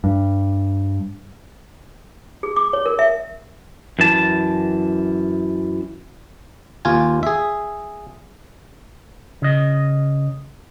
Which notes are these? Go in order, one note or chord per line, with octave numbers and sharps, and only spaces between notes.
G2
G#4
D6
C#5
A#4
E5
F#2 E3 A5
D#2 F4 G#5
G#4 E5
C#3 D#5